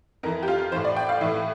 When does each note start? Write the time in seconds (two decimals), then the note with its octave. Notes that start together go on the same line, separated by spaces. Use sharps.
0.23 F2 E3 A#4
0.42 G4
0.48 F4
0.72 A2 E3 C5
0.85 D5
0.96 G5
1.09 F5
1.21 A2 E3 E5